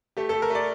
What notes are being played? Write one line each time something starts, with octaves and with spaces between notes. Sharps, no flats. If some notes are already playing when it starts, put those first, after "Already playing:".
A3 G4
A4
A3
A#4
A3 D5